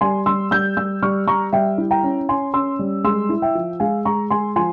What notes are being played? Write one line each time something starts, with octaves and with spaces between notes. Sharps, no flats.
G3 G#5 C6
G3 C6 E6
G3 E6 G6
G3 E6 G6
G3 C#6 F6
G3 A#5 C#6
G3 E5 G5
E4
G5 A#5
C#4
C#4 G#5 C6
C#4 C6 E6
G3
G#3 C6 E6
E4
E5 G5
F3
G#3 F5 G#5
G#3 A#5 C#6
G#3 G#5 C6
F3 G#5 C6